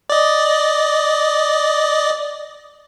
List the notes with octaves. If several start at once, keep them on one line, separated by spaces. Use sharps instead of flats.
D5 D#5